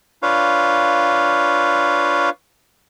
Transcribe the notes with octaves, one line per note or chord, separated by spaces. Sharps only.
D4 F4 B4 C#5 F5